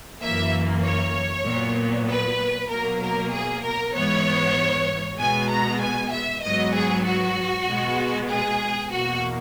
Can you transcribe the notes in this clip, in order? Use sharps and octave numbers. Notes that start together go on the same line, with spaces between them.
F#2 E3 A#3 E5
C#5
A#2 F#3 B3
B4
B2 F#3 A#3 A#4
A#4
G#4
A#4
G#2 E3 B3 C#5
B2 G#3 B3 G#5
A#5
G#5
E5
G#2 F#3 B3 D#5
G#4
F#4
B2 G#3 B3
G#4
E2 B2 A#3 F#4